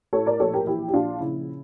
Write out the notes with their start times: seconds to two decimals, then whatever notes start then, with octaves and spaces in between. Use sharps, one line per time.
0.13 A2 A4 C#5
0.26 A#4 D5
0.40 A#1 A4 C#5
0.53 G4 A#4
0.67 E3 E4 G4
0.88 G4
0.94 A#1 D4 F4
1.20 C#3 E4